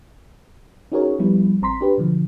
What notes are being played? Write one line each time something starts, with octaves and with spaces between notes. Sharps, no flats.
C#4 D#4 F#4 G#4 A#4 C#5
F3 G3 B3 E4
A1 C4 A#5 C6 B6
D4 G4 B4
B2 D3 F3